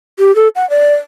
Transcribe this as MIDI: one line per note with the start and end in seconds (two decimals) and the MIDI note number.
0.19 0.34 67
0.36 0.48 69
0.56 0.68 78
0.70 0.93 74